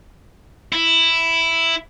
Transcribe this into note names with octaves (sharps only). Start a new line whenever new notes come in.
E4